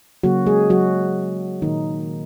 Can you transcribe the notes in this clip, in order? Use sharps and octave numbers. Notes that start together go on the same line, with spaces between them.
C#3 F#3 A#3 F#4
G#3 G#4
F#3 F#4
A#2 D#3 A#3 D#4